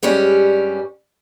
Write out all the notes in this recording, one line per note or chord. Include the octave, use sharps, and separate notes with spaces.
G2 G3 G#3 C#4 G4